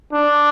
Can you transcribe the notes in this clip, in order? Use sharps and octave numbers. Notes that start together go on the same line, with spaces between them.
D4